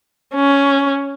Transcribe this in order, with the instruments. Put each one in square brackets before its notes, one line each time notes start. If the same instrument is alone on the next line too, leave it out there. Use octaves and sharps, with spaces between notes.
[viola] C#4